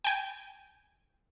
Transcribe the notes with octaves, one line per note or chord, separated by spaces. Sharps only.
G5 G#5